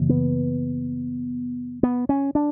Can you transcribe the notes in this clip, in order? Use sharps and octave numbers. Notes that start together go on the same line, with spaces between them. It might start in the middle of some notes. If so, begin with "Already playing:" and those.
Already playing: F#2 C#3 E3 A#3
B3
B3
C#4
D4